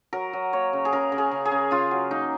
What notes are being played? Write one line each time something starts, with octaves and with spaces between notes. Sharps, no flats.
F#3 A#4
F#3
A#3 C#5
C#3
G#4
C#3 A#4
C#3
G#4
C#3
G#4
C#3
C#3 F4
F#3
A#3 D#4